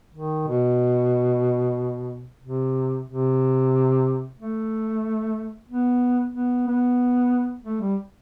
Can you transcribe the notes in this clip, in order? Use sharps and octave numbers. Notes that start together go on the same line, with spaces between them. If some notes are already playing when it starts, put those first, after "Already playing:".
D#3
B2
C3
C3
A3
B3
B3
B3
A3
G3